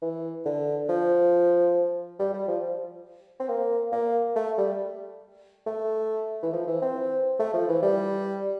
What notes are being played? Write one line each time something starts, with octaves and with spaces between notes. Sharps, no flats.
E3
D3
F3
G3
G3
F3
C4
A#3
A#3
A3
G3
A3
E3
F3
E3
C4
A3
F3
E3
G3